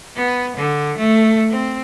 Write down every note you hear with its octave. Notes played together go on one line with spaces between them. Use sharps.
B3
D3
A3
C4